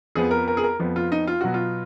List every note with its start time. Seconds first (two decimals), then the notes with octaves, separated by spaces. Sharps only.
0.15 F2 F3 B3 G#4
0.31 A#4
0.48 A#4
0.57 G#4
0.63 A#4
0.79 F2 F3 B3
0.96 F4
1.12 D#4
1.27 F4
1.41 B2 F#3 B3 F#4
1.54 F4